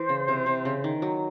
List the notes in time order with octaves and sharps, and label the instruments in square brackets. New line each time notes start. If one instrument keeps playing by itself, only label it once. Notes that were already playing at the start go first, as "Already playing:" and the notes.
Already playing: [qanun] E3 [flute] C5
[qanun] C#3
C3
C3
C#3
D#3
F#3